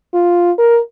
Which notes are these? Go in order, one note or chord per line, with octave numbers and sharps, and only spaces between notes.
F4
A#4